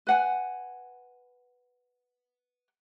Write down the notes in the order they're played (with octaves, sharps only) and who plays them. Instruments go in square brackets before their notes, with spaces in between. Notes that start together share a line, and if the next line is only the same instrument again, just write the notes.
[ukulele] B4 F#5 G#5